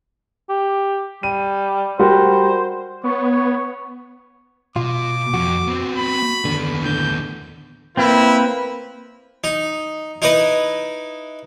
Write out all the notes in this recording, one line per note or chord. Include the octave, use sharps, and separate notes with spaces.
G4
G3 D#7
G3 F#4 A#4 C5
B3 C#5 C#6
B2 F4 D6
F2 F#4
B3 C4
B5
D#2 D3 B3
A2 D3 G6
A#3 C4 E4 B4
D#4
D#4 E4 B4 D#5